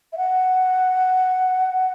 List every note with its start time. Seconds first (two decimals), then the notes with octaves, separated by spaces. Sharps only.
0.13 E5
0.18 F#5